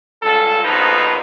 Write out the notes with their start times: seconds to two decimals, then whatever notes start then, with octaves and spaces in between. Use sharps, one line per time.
0.23 C#2 G2 F4 A4
0.64 A#1 D#2 B2 F3 D#4 B4